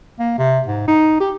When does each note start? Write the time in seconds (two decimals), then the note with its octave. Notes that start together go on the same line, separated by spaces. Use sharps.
0.19 A#3
0.38 C3
0.67 G#2
0.88 D#4
1.20 G4